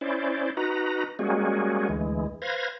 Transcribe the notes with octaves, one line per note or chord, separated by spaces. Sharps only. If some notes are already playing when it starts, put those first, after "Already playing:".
C#4 E4 C5 D5
D#4 F#4 B4 A#5
G3 G#3 A#3 C#4 F#4 G#4
D2 E3 G#3
B4 C5 F5 G#6 A#6